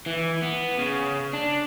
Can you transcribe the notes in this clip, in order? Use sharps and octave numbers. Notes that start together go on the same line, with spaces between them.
E3
B3
C#3
D4